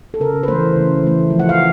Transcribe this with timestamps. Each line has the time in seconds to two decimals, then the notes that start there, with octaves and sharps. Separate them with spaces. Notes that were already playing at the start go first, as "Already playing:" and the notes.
0.14 A4
0.20 C#3 A#4
0.43 B4
0.48 E3 A3 C5
0.76 C#3
1.03 E3 A3
1.30 F3
1.39 F#5
1.49 F5